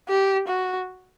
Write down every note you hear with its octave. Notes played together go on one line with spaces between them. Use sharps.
G4
F#4